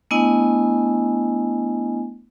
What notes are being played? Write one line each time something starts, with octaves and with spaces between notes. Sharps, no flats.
A3 B3 D4 E4 D#5 G#5